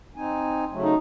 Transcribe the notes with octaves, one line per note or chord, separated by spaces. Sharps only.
C4 D#4 G#5
C#3 F#3 A3
D#4